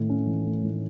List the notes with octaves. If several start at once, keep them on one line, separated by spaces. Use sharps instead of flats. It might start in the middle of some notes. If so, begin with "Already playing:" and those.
Already playing: A2 D#3 A3
C#4
E3
A3
A2